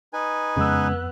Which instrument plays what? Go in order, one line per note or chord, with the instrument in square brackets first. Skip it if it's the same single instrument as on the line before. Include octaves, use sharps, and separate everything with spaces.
[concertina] D#4 B4 G#5
[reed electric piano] F2 E6 [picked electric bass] C#3 G#3 [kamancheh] B3 F#6